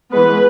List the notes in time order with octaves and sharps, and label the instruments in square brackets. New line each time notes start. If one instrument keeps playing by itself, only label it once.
[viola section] E3 G#3 B3 B4